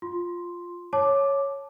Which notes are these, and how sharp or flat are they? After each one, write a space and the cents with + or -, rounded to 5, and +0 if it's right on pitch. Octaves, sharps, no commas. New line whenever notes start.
F4 +0 C6 +0
C#5 +0 A5 -25 D6 +0